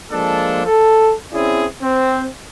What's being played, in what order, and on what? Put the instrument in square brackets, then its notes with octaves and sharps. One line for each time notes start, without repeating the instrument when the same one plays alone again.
[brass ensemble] F3 G#3 A#3 D4 A4
A4
C4 C#4 E4 G#4 D5
C4